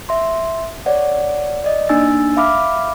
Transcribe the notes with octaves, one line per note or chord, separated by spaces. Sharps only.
E5 C6
C#5 D5 F#5
D5 D#5
A#3 D4 D#4 G#5 E6 A6
E5 F5 B5 D6 F6